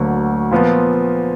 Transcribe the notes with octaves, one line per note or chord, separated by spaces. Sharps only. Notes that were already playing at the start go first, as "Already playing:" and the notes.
Already playing: D2 D3 F#3 A#3
A#2 F3 B3